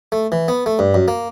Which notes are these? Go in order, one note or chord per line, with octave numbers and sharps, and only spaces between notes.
A3
E3
B3
A3
G2
F#2
A#3